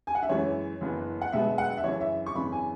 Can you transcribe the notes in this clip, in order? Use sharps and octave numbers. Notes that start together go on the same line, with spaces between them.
G#5
F#5
E5
F#2 E3 G#3 C#4 C#5
F#1 F#2 E3 B3
F#5
B1 B2 G#3 B3 E5
F#5
E5
F#2 C#3 E3 C#5
E5
C#6
G#1 F#2 C#3 E3 B5
G#5